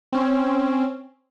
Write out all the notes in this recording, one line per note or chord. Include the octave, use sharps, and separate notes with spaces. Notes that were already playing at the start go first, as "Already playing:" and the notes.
C4 C#4